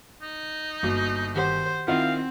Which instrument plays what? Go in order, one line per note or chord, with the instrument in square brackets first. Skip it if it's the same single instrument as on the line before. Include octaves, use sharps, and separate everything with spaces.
[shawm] D#4
[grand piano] G1 [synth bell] A#3 F#4
[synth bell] D#3 G4 F#5 [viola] C5
[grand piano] D#3 E4 F4 [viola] C4 [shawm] F5 [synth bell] F#5